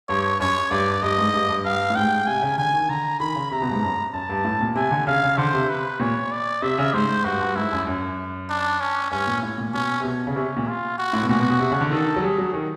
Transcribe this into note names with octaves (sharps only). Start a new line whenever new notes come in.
G2 C#5
F#2 C#5
G2 D5
G2 D#5
G#2
G2
G2
G2 F5
A2
G#2 G5
C3 G#5
C#3
D3 G#5
D#3
D3 A#5
D#3 B5
C#3
C3 A#5
B2
G2
G#2
F#2
F#2 A5
G2
A2
A#2
C3 G#5
D3
C#3 F5
C#3
D3 C5
C3
B4
A#2 C#5
D5
C3 E5
C#3
G#2 C5
G2 F#4
G2
G#2 E4
F#2
F#2
D4
C#4
G2 C#4
A#2
A2
A#2
B2 C#4
C3
B2
C#3
C3 C#4
A#2
F4
F#4
A2
B2
A#2 F#4
B2
B2
C3
C#3
D3
D#3 A4
F#3
G3 G#4
F#3
D#3